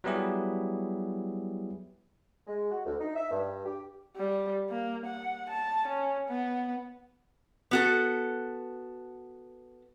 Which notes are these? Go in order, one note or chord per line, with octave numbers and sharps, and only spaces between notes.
F#3 G3 B3 E4 G4 G#4
G#3
F#4
D2
D#4
E5
G2
G4
G3
A#3
F#5
A5
C#4
B3
B3 F#4 A4